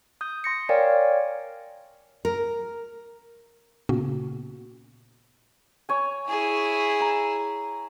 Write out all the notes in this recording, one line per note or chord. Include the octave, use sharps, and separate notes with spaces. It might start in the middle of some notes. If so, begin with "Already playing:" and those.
D#6 G6
C6 A#6 C#7
A#4 C#5 D5 F5 G5 G#5
A#4
A#2 C#3 A#3 B3 C#4 F#4
C#5 G#5
E4 G#4
A#5